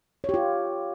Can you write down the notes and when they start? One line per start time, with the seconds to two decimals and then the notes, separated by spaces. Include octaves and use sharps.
0.24 C#5
0.29 G4
0.34 F4